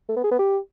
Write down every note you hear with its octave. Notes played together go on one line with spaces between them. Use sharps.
A3
B3
G#4
B3
G4